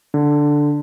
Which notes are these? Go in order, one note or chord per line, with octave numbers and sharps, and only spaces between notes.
D3